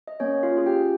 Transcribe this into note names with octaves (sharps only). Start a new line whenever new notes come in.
D#5
A#3 C#4 C#5
F4 F5
C#4 F4 G#4
G4 G5